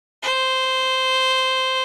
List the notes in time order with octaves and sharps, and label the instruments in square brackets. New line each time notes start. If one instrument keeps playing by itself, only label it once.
[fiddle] C5